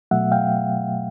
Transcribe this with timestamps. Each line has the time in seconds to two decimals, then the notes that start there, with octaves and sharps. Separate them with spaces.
0.11 B2 F#3 A3 E5 F#5
0.32 F5 G5